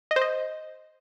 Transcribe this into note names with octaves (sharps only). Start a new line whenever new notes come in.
D#5
C5
D#5